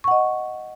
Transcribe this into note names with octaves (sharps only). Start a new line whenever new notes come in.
D#5 F#5 C#6